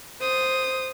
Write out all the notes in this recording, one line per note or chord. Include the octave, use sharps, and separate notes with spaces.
C5 D#6